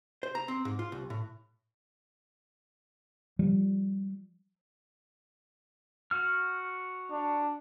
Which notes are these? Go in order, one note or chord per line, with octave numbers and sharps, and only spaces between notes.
C5
A#5
C4
G#2
F4
C2
A2
F3 G3
F#4 F6
D4